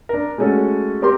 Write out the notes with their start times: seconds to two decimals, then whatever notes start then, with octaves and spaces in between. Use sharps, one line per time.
0.09 D4 A#4
0.38 G#3 A3 C#4 F#4 A4
1.02 C4 G4 A#4 C6